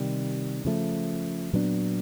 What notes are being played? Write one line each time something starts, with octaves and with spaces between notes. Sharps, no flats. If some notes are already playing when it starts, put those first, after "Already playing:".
Already playing: C3 D#3 G3
C#3 F3 A3
A#2 F#3 B3 D4